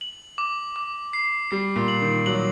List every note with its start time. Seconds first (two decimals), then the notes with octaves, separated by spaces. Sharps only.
0.01 F#7
0.38 D6
0.76 D6
1.13 C7
1.51 G3 C7
1.76 A#2
1.88 F#7
2.01 D#3
2.26 F#3 F#7